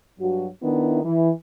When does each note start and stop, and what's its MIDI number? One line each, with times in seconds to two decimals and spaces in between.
0.20 0.47 43
0.20 0.47 54
0.20 0.47 66
0.63 1.03 51
0.63 1.03 59
0.63 1.03 62
0.63 1.03 64
1.05 1.31 52